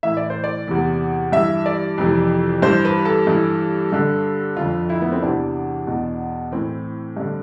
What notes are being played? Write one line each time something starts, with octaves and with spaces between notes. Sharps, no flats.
A2 E3 E5
D5
C5
D5
E2 C3 E3
G2 E3 E5
D5
F2 C3 E3
G2 E3 C5
B4
A4
G2 E3
G2 D3
F2 D3 F4
E4
B3
C4
E2 C3 E3 D4
E2 B2
A2 E3 C4
G2 D3